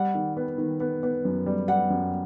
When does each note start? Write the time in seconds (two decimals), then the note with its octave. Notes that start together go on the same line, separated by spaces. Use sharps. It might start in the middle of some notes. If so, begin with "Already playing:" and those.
Already playing: G3 F#5
0.15 D#3
0.37 B3
0.58 D#3
0.80 B3
1.03 B3
1.25 F#2
1.46 G3
1.68 G3 F#5
1.90 F#2